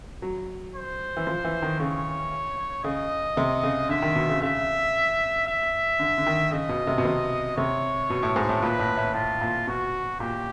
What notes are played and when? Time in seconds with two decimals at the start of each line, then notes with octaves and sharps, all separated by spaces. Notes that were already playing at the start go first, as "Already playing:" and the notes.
0.22 F#3
0.75 C5
1.17 E3
1.27 F3
1.45 E3
1.62 D#3
1.80 C#3 C#5
2.84 C#3 D#5
3.37 C3
3.63 C#3
3.89 D3 E5
4.02 D#3
4.16 B2
4.29 C#3
4.42 C#3 E5
5.47 E5
5.99 D3
6.18 D3
6.27 D#3
6.52 C#3 D#5
6.69 B2
6.87 C3
6.98 B2
7.05 C3
7.57 C3 C#5
8.10 B2
8.23 A2
8.36 G#2
8.49 A2
8.62 A#2 B4
8.79 A2
8.97 A2
9.14 A2 F4
9.41 A#2
9.67 B2 F#4
10.20 A#2 G4